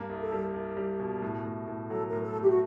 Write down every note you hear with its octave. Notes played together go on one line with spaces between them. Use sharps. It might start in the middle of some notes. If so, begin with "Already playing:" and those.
Already playing: G2 A#3
C2
A4
G3
C2
G3
B2
A2
A2
A2
F#3 A4
A#4
A2
A4
A3
G4
F#4